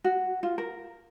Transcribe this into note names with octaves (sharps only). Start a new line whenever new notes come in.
F#4
F4
A#4